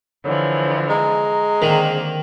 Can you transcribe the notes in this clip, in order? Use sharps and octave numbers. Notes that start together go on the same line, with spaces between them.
D3 E3 F3 C#5
G#3 A#5
D3 D#3 A#3 C4